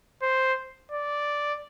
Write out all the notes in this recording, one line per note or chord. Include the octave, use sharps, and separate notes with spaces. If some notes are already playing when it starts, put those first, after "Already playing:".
C5
D5